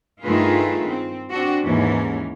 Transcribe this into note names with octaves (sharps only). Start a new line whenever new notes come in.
G2 D#3 A3 F4 G#4 B4
C4
C4 D4 F#4
D#2 G#2 E3 C#4